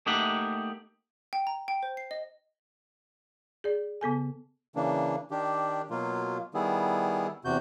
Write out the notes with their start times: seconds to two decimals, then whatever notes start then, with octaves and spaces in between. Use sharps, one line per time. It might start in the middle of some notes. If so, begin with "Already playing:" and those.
0.06 A3 A#3 D#4 G4 E5 F#5
1.33 G5
1.47 A#5
1.68 G5
1.83 C5
1.97 C7
2.11 D#5
3.64 G#4 D5
4.01 C#3 B3 A4 G#5
4.76 C#3 E3 A#3 D4
5.31 D#3 D4 G4
5.90 B2 F#3 A#3 F4
6.54 D#3 G3 B3 E4 G#4
7.45 E2 C3 F#4 G6